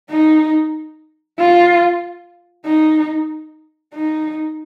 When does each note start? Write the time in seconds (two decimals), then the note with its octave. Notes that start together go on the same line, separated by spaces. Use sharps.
0.11 D#4
1.39 F4
2.66 D#4
3.94 D#4